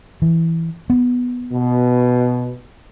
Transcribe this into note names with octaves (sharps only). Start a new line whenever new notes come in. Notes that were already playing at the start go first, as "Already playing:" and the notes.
E3
B3
B2